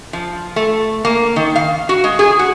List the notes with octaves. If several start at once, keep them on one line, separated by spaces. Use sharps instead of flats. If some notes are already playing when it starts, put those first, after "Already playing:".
F3
A3
A#3
D#3
F5
F#4
G#3
G#4
F#4